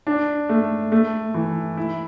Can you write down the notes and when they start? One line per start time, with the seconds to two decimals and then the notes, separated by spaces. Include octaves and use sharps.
0.07 D4
0.49 A3
0.92 A3
1.34 E3
1.77 E4